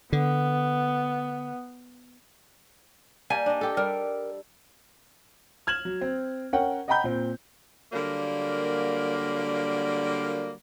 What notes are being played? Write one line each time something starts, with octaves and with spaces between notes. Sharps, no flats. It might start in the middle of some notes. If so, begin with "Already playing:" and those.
D3 B3
G3 A#3 G#5
D4 D#5
G4 A4
G3 A#4
F6 G#6 E7 F#7
F#3
C4
C#4 A#4 F#5 G5
D#5 F#5 G5 A#5 B5 G6
A#2 C4
D3 F#3 G3 A#3